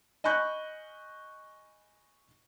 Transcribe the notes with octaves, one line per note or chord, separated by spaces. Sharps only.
D#5 G#5 B5 C#6 F#6 G6